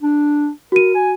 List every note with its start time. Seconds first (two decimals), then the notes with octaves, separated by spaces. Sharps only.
0.02 D4
0.72 F#4 A#4 D#7
0.94 G#5